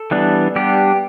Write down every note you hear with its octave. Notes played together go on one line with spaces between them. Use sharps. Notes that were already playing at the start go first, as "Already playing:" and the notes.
Already playing: A4
E3 G3 B3 D4
G3 B3 D4 G4